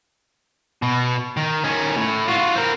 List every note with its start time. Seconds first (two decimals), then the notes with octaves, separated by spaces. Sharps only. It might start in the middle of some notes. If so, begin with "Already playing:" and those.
0.82 B2
1.37 D#3
1.64 D#3 C#4
1.97 A2
2.28 F4 F#4
2.56 C4 A#4